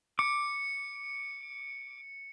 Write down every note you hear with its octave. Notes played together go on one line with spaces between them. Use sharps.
D6 C#7